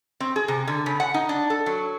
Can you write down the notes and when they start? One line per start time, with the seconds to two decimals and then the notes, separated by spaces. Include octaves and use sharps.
0.20 C4
0.36 G#4
0.48 C3
0.68 D3
0.86 C#3
1.00 F#5
1.14 D#4
1.29 D4
1.50 A4
1.66 F#3